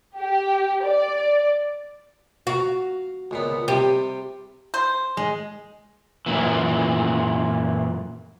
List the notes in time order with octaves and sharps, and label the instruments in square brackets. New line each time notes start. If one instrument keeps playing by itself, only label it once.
[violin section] G4
D5
[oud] F#4 [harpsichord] F5 A#5
[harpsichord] C#2 A#2 B3
[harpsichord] C3 G3 [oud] G4
[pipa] C5
[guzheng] G#3
[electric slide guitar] F#2 A#2 E3